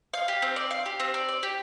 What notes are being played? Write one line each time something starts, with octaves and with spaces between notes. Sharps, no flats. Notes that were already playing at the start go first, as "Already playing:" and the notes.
F5
G4
C4
D5
F5
G4
C4
D5
D5
G4